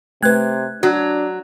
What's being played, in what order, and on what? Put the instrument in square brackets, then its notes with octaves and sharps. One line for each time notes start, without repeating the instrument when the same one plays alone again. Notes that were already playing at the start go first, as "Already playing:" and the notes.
[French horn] C3 [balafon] A3 B4 [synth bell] F#6 G#6
[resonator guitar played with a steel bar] F#3 [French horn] D4 [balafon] F#4